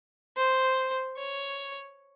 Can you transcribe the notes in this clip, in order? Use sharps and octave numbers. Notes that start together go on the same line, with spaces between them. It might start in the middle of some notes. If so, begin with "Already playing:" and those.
C5
C#5